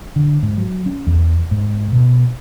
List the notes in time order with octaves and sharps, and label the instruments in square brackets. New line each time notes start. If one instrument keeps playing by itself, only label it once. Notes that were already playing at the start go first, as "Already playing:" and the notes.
[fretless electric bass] D3
G#2
F#3
C#4
E2
G#2
B2